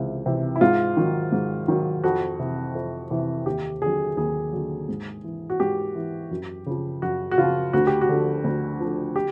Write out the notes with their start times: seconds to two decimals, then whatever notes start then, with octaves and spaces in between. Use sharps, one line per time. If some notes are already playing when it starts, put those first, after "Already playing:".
Already playing: C#2 C3 E3
0.26 C3 E3
0.56 E4
0.61 G#2 F4
0.97 D#3 F#3
1.32 G#2
1.68 D#3 F#3
2.04 F2 F#4
2.39 C3 E3
2.75 F2
3.10 C3 E3
3.46 D#2 G4
3.82 D3 F#3 G#4
4.17 D#2 G#4
4.52 D3 F#3
4.89 G#2
5.24 E3
5.50 F#4
5.60 G#2 G4
5.95 E3
6.31 F#2
6.66 C#3 F3
7.02 F#2 F#4
7.31 F#4
7.38 C#3 F3 F4
7.73 D2 F#4
7.87 G4
8.01 F#4
8.09 D3 F3
8.44 D2
8.80 D3 F3
9.16 G4